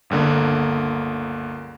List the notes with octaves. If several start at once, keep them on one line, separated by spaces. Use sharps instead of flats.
G1 C#2 D3 A#3